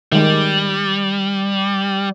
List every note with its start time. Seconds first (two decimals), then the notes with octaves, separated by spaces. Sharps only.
0.12 D#3 G3 G#3